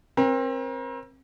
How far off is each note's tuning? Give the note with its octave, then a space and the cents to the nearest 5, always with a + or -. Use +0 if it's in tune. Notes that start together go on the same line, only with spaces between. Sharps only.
C4 +30 A#4 +40